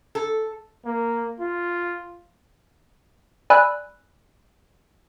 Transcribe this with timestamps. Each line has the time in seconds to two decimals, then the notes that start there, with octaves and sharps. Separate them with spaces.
0.15 A4
0.85 A#3
1.40 F4
3.50 D5 G#5 B5 E6 F#6